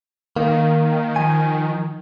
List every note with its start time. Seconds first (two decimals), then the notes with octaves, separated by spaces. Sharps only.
0.36 D#3 A#3
1.16 F3 G#5